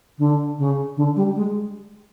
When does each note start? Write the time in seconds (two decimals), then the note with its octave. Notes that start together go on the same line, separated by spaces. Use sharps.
0.18 D3
0.58 C#3
0.97 D3
1.16 G3
1.35 G#3